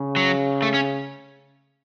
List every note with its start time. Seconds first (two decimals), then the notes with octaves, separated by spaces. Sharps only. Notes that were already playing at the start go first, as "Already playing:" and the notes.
Already playing: C#3
0.16 F#3
0.62 A3
0.74 C#4